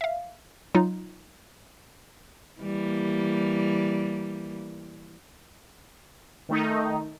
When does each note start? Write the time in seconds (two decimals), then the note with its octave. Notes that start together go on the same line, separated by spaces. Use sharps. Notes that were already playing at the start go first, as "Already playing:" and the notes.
0.01 E5 F5
0.75 F#3 D#4 F4
2.61 E3 G3 A#3
6.49 D#3 A3 D#4